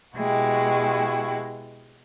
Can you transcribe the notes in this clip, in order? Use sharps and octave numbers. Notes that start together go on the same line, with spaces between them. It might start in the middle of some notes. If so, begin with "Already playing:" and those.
B2 G#3 E4 F#4 G4